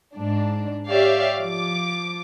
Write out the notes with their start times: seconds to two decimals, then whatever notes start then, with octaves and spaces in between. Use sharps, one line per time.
0.15 G#2 D4
0.89 G4 C#5 D5 E5 F5
1.38 F3 D6